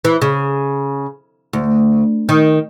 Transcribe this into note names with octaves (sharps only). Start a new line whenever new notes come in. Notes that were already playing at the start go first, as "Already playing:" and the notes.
E3
C#3
D2
D#3